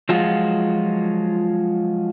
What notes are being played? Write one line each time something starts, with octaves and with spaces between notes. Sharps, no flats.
F3 F#3 G#3 F4 F#4